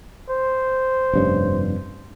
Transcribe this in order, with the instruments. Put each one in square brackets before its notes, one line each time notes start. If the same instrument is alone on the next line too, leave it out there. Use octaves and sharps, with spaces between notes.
[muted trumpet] C5
[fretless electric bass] F1 G2 C#4